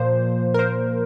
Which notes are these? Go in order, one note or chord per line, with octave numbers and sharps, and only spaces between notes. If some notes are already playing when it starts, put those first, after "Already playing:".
Already playing: A#2 F3 A#3 C5
A#4
C5